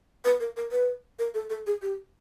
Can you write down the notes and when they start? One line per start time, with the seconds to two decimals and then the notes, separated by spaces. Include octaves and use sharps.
0.25 B4
0.40 A#4
0.57 A#4
0.71 B4
1.19 A#4
1.34 A4
1.50 A4
1.67 G#4
1.82 G4